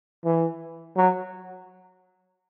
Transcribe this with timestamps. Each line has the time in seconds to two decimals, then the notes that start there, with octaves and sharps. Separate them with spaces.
0.25 E3
0.97 F#3